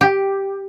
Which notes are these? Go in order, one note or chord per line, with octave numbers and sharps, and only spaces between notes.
G4